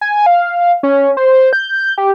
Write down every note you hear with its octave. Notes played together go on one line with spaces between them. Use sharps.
G#5
F5
C#4
C5
G6
G4